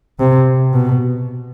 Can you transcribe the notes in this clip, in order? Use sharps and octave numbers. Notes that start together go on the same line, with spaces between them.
C3
B2